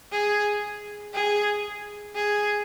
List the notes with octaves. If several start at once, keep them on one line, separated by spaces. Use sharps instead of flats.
G#4
G#4
G#4